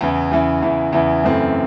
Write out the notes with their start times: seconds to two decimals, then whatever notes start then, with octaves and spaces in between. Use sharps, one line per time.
0.01 E2 C#3 E3
0.31 E2 C#3 E3
0.62 E2 C#3 E3
0.92 E2 C#3 E3
1.23 F#2 C#3 E3 A3 C4